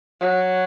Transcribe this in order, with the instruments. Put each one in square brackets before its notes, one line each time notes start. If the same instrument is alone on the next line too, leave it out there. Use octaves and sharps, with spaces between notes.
[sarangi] F#3